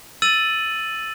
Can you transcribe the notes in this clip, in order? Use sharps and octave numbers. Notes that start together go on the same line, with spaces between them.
E6 A6 D#7 F#7